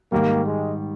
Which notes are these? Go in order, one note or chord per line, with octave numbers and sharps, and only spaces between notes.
G#2 D#3 G3 A#3
G#3